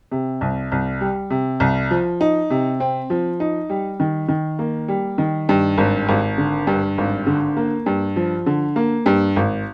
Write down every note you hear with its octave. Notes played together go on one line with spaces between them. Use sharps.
C3
C2
C2
G3
C3
C2
F3
D#4
C3
C4
F3
D#4
G3
D#3
D#3
A#3
G3
D#3
G2
G#1
G#1
D3
G2
G#1
D3
A#3
G2
F3
D3
A#3
G2
G#1